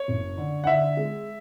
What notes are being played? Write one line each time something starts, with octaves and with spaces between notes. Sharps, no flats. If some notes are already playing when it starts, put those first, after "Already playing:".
Already playing: C#5
F#1
D3
F#5
D3 E5
G#3